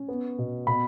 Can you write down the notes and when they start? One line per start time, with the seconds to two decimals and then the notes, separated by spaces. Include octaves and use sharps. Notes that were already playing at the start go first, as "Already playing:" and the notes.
Already playing: C#4
0.08 B3
0.38 B2
0.67 B2 B5